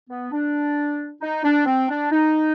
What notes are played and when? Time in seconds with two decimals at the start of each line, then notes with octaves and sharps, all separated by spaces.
0.10 B3
0.32 D4
1.22 D#4
1.43 D4
1.66 C4
1.89 D4
2.11 D#4